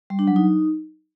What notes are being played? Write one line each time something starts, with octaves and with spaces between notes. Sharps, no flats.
G3
D4
F#3
D#4